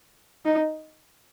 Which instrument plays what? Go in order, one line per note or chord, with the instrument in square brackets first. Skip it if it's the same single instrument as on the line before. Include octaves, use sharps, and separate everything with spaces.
[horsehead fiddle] D#4